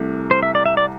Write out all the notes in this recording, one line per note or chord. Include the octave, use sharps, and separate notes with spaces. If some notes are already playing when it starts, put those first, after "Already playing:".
Already playing: C2 C3 A3
C5
E5
D5
E5
D5